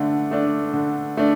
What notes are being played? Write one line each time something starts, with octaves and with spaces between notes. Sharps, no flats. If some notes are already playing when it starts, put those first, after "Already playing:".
Already playing: D3 A3 D4
A3 D4
D3
A3 D4